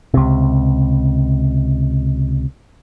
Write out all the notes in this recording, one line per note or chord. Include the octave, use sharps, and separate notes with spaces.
C#2 C3